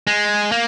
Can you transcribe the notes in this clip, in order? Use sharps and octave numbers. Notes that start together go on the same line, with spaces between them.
G#3
A#3